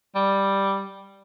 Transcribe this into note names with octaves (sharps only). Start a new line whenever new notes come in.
G3